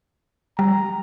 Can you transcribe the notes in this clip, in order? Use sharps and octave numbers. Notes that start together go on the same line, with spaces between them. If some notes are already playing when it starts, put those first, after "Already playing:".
G3 A#5